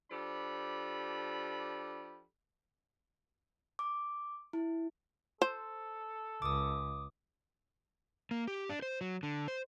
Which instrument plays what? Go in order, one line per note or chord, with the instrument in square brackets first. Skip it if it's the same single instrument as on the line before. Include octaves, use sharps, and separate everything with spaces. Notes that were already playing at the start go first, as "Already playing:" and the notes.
[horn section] F3 D4 G4 A4 B5
[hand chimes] D6
E4
[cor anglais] A4 [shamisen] C5
[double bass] C#2 [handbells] D6 D#6
[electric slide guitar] A#3
G4
D4
C5
F#3
D3
C5